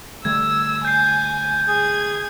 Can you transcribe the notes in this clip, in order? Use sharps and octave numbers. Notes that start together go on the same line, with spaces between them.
D3 G3 A3 E6 G#6
G#5 G6 C7
G#4 G#6